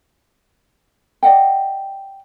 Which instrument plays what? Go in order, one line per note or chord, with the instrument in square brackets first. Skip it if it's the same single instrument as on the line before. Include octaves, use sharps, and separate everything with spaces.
[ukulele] D5 D#5 F#5 G5